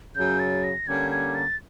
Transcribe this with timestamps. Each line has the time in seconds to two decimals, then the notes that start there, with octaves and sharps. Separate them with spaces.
0.15 F#2 C#3 F#3 G6
0.39 A6
0.64 A#6
0.87 D3 G3 A#3 C#4 G#6
1.12 G#6
1.35 A6